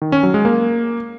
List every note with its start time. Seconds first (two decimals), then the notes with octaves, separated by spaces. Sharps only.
0.02 D#3
0.12 C#4
0.23 F#3
0.34 G#3
0.45 A#3